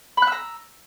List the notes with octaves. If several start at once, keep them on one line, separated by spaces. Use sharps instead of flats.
A#5 B5 E6 F#6